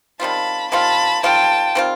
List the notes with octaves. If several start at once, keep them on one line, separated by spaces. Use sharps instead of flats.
D#3 G3 C4 F4 A5 B5
D#3 G3 C4 F4 A5 B5
D#3 G3 C4 F4 G5 A5
D#3 G3 C4 F4